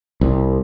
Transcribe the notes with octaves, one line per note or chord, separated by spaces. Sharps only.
C2